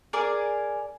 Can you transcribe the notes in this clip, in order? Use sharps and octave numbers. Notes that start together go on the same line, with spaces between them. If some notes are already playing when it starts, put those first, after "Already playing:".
G#4 A#4 D5 G#5